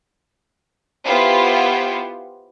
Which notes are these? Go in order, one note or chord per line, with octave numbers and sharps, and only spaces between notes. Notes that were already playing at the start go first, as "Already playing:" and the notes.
B3 E4 F4 G4 C5